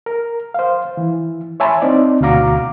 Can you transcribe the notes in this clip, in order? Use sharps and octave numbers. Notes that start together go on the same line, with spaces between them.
A#4
C5 F5
E3
C#5 E5 G#5 A5 B5 C6
C4 D#4 C5 D5
D2 B2 F#4 F5 A#5 D6